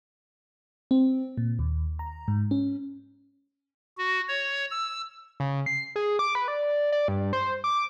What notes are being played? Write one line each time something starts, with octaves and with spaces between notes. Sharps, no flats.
C4
A#2
D#2
A#5
G#2
C#4
F#4
C#5
E6
C#3
C7
G#4
D6
B4
D5
D5
G2
C5
D6